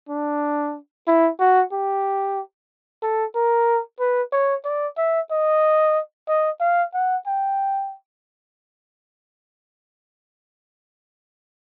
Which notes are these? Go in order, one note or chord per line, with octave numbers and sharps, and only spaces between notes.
D4
E4
F#4
G4
A4
A#4
B4
C#5
D5
E5
D#5
D#5
F5
F#5
G5